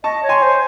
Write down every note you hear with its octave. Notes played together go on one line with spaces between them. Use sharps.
D#5 A5 C#6
C#5
G#5 C6
C5